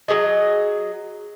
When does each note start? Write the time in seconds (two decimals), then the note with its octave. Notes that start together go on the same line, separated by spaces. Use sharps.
0.08 F#3 G4 G#4 D#5